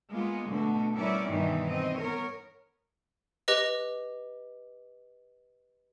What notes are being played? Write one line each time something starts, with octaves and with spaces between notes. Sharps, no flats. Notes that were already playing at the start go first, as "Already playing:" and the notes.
G#3 A#3 B3 F4
B2 D3 A3 F#4
G3 B3 C#4 E4 A#4 D5
G2 B2 D#3 E3 G3 D#4
C4 D#5
B3 A#4 C#5
G4 B4 D#5